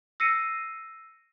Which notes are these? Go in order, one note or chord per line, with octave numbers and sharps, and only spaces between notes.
E6 A#6 C7 C#7 D#7